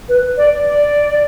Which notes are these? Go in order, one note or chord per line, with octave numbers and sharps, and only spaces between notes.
B4
D5
D5